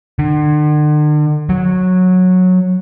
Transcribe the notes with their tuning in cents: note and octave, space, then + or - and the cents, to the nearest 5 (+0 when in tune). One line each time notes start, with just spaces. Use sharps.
D3 +40
F#3 -10